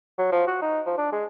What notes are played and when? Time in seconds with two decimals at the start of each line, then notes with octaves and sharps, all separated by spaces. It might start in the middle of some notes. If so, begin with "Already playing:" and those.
0.18 F#3
0.32 F3
0.47 F#4
0.62 D#4
0.86 F3
0.98 D4
1.12 G#3